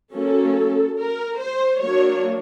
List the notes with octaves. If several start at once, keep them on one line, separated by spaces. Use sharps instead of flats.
F#3 A#3 C#4 A4
A#4
C5
F#3 A#3 D4 C#5